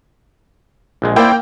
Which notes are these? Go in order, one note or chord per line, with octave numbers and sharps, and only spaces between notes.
A#1 G#3
A#3 E4 C5 D5 G5